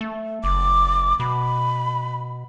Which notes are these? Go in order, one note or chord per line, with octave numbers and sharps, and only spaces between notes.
A3
F#1 D6
B2 B5